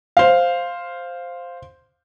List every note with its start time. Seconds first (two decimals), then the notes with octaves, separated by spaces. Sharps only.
0.17 C5 F5